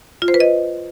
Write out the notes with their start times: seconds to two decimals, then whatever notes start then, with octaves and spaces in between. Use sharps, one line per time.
0.22 F4
0.28 C5
0.34 B4
0.40 D#5